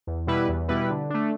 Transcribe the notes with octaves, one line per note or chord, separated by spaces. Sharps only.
E2
B2 G3 E4 B4
E2
B2 G3 E4 B4
D3
A3 D4